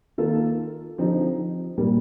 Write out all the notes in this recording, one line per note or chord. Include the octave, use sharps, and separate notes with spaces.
D#3 A#3 F4 A4
D3 F3 C4 D#4 G4
A#2 G3 A#3